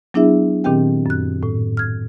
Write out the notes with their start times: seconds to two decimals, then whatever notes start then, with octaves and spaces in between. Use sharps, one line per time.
0.14 F#3 B3 D4 E4 G#4 E5
0.64 A#2 D#3 C4 G4 G5
1.06 F#2 F#6
1.43 A2
1.77 F6 G#6